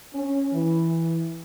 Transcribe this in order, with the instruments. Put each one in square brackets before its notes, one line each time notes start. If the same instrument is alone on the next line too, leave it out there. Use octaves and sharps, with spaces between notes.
[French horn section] C#4
E3